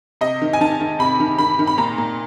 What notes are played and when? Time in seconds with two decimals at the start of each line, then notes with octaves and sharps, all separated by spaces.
0.21 C3 D#5
0.42 D#3
0.53 G#5
0.61 D#3 A5
0.81 D#3
0.99 C3 B5
1.20 D#3
1.38 D#3 B5
1.59 D#3
1.67 B5
1.78 A#2 A#5
1.98 A#2